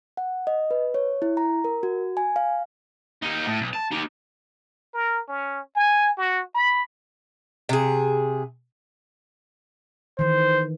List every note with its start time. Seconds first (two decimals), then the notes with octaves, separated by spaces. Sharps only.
0.17 F#5
0.47 D#5
0.71 B4
0.94 C#5
1.22 E4
1.37 A#5
1.64 A#4
1.83 F#4
2.17 G#5
2.36 F5
3.22 D#2 D#4
3.46 A2
3.61 B1
3.73 A5
3.91 D#4 G4
4.94 A#4
5.28 C#4
5.76 G#5
6.18 F#4
6.55 B5
7.69 C3 G#4
10.19 D#3 E3 C5